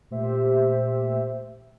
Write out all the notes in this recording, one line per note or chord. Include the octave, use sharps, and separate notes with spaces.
A#2 A3 G4 C5 E5